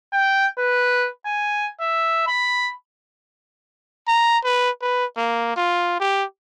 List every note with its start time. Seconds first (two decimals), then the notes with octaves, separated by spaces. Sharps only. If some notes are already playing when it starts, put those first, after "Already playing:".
0.13 G5
0.59 B4
1.26 G#5
1.80 E5
2.27 B5
4.08 A#5
4.44 B4
4.82 B4
5.17 A#3
5.56 F4
6.00 G4